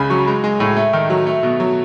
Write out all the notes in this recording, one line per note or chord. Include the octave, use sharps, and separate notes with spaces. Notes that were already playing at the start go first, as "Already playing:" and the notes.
Already playing: C#2 C#3 G#5 B5
F#3 C#6
G#3
G#3
A2
A3
D#3
F#3
A3
B2
F#3